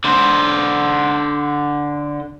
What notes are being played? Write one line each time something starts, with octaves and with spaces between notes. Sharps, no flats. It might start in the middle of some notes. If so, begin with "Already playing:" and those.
D3 C5